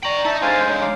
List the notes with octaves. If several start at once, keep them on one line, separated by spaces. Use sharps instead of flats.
D5 G5 A#5 C#6 F#7
D#4 E5 A5
D3 G#3 C5 F5 G#5 C6 G6 A6
D#4 C#5
F5 D6